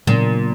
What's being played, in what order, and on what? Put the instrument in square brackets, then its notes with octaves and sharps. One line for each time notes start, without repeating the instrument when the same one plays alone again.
[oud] A#2 [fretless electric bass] C#3 F#3 B3 D4